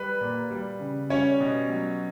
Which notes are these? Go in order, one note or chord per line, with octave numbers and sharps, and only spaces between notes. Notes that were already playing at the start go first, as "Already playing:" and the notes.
Already playing: G3 B4
A#2
G3
C#3
G3 C#4 C#5
B2
F#3